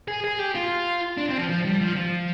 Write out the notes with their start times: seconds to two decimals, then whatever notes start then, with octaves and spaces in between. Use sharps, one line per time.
0.08 G#4
0.25 G#4
0.39 G4
0.55 F4
1.17 D4
1.29 C4
1.38 F3
1.49 F3
1.65 G3
1.81 F3
1.96 F3